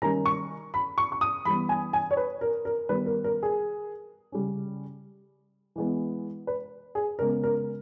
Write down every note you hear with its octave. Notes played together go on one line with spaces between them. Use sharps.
D#3 G3 A#3 C#4 A#5
C#6
B5
C#6
C#6
D#6
E3 G3 B3 B5
G#5
G#5
C#5
B4
A#4
A#4
D#3 G3 B3 B4
A#4
A#4
G#4
C#3 G3 C#4
E3 G#3 B3
B4
G#4
C#3 G#3 B3 A#4
A#4